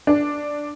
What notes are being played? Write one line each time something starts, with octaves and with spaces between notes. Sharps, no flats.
D4